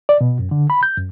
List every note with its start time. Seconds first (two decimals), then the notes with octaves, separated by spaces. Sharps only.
0.09 D5
0.21 B2
0.39 F#2
0.51 D3
0.70 B5
0.83 G6
0.97 F#2